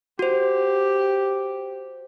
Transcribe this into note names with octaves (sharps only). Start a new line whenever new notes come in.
F#4 G4 C5